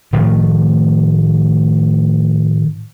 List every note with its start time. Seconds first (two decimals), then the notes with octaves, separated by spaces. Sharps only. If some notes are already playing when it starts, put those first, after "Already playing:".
0.13 A2 D#3 F3 A3